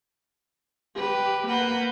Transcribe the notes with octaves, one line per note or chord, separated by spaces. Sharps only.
G4 B4
A#3 B4 F#5 G6